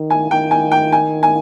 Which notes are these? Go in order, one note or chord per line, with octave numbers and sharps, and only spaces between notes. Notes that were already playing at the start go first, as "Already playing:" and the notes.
Already playing: D#3
G#5
D#3 G5
G#5
G5
G#5
G#5